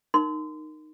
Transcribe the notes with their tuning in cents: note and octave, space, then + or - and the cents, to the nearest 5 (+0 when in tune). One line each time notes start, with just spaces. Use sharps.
D#4 -15 A#4 -5 C6 -30